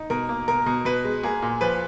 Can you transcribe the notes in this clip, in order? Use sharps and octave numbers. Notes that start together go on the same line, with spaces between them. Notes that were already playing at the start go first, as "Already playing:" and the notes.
Already playing: D#4
B2 A#4
A#3
B2 A#4
B2
B2 B4
G#3
A#3 G#4
A#2
F3 B4